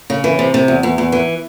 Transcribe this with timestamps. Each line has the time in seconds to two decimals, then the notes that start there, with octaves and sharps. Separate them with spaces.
0.10 C#3
0.24 E3
0.39 C3
0.54 C3
0.68 E2
0.83 E2
0.98 E2
1.12 E3